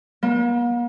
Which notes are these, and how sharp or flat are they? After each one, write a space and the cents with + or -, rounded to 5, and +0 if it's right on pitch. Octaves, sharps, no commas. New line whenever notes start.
A#3 +45